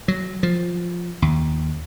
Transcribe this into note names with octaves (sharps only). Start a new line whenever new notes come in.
F#3
F3
D#2